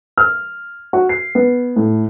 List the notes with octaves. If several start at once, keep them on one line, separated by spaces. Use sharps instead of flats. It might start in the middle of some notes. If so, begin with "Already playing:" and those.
F6
F#4
C7
B3
A2